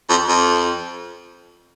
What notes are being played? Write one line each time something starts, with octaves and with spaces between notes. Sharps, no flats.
F2
F2